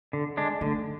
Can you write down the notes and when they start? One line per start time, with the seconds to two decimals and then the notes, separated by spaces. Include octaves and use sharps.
0.13 D3
0.37 G#3 D4
0.61 D3 A3